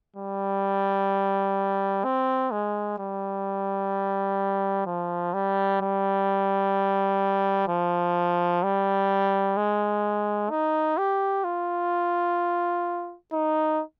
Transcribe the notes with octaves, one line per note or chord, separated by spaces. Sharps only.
G3
C4
G#3
G3
F3
G3
G3
F3
G3
G#3
D#4
G4
F4
D#4